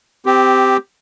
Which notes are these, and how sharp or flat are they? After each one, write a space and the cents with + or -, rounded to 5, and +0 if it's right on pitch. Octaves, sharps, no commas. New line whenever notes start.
C4 -20 G4 +0